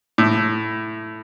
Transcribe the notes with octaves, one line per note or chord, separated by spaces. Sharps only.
A2